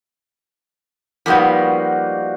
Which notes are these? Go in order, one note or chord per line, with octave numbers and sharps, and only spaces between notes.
F3 G3 A#3 B3 D#4 F#4